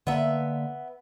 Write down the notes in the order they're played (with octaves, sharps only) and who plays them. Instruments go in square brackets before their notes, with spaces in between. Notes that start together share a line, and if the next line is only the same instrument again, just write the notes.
[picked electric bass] D3 A#3 [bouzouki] B3 E5